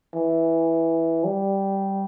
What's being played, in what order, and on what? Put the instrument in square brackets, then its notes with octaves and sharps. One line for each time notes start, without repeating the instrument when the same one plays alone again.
[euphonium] E3
G3